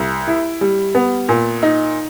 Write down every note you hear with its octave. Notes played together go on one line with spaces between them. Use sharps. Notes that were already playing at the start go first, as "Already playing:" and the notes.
Already playing: C2
E4
G3
B3
A#2
D#4